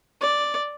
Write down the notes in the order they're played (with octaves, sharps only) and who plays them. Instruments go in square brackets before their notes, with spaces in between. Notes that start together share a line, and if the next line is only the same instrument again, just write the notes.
[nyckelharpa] D5